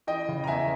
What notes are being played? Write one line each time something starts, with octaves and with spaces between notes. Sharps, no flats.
E3 D#5 G5
C#3
A#5
E2 E5 G#5